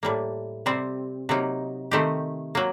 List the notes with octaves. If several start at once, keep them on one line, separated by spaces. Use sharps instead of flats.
A2 G3 A#3
C3 G3 C4
C3 F#3 A#3 D#4
D#3 A3 C4 G4
F#3 A#3